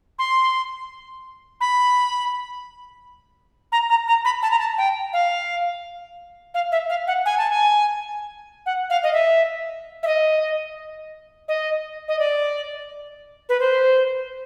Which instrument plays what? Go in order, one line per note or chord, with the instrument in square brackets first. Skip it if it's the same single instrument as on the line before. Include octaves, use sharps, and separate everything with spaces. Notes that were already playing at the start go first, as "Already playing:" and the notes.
[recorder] C6
B5
A#5
A#5
A#5
B5
A5
A#5
A5
G5
F5
F5
E5
F5
F#5
G#5
A5
G#5
F#5
F5
D#5
E5
E5
D#5
D#5
D#5
D5
B4
C5